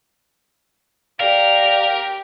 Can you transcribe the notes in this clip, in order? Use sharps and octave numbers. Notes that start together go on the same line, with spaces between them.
G4 A#4 D5 F5